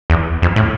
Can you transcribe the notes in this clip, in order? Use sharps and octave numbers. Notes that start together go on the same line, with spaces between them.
E2
F2
A2